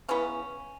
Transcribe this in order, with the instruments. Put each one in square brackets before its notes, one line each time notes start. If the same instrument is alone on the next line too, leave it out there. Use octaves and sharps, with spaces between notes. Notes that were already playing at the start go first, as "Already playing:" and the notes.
[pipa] C#3 E3 B3 C#4